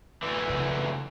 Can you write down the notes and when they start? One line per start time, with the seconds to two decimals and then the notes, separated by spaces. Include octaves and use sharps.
0.23 D2 E3
0.50 C#3 F3